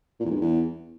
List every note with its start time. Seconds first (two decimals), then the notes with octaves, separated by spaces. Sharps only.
0.20 A#2
0.25 E2
0.30 G#2
0.36 G2
0.41 E2